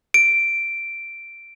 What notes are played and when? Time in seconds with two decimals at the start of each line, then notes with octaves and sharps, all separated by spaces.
0.14 D7